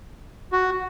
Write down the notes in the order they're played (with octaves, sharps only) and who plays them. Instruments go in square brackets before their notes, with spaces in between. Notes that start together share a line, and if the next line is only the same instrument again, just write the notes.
[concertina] F#4